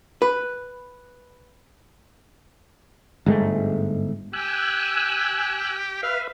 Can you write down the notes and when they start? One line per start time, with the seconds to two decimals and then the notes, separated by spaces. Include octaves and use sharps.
0.22 B4
3.26 G1 G#2 G#3 A3
4.33 G4 G#5 E6 F#6
6.03 B4 E5 F5